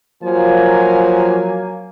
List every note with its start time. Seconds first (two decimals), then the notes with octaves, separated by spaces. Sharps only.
0.23 F3 F#3 A#3 G#5